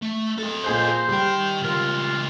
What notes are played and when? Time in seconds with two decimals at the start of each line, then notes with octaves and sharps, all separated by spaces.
0.02 A3
0.39 A4 D#5
0.64 A#2 G#4 C5 G6
1.09 D#3 G3 G5
1.63 C#2 F4 A#4